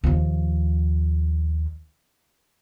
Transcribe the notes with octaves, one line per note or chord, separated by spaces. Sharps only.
D#2 F3